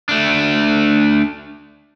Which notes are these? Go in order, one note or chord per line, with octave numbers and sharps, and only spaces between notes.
A3 D4